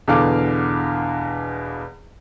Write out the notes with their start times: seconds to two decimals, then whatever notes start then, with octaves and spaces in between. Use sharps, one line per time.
0.08 E2 B2 D3 F5 D6